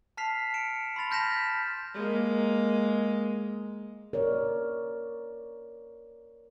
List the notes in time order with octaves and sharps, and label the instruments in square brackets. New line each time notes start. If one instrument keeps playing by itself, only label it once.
[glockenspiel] A5 F6 B6 C7 F7
C#7 D7 E7
B5 C6 A6 F7
A5 F6 G6 A#6 B6 E7
B6
[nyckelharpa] G#3 A#3
[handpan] A#4 C#5 D5